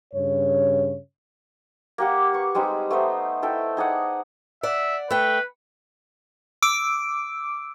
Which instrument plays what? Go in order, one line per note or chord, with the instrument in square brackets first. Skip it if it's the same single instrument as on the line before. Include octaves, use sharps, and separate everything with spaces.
[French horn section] G2 C#3 C#5
[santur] A#3 G4 F#5
B4 C#6
G3 G#3 C4 D#4
A3 B3 D#4 C5
E4 A4 G5
D#4 G#4 D5 F#5
[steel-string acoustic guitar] D5 F#5 [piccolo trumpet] E5
[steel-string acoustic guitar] A3 G5 [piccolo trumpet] B4
[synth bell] D6 E6 D7